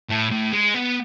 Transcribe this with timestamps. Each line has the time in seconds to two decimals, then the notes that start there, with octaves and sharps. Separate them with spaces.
0.09 A2
0.31 A2
0.53 G#3
0.75 B3